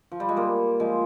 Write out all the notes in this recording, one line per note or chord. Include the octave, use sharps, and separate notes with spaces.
F3
G3
G#3
G3 A#3
F3 G#3